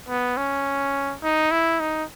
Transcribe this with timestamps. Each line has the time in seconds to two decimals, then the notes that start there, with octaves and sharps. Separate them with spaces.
0.09 B3
0.37 C#4
1.23 D#4
1.51 E4
1.80 D#4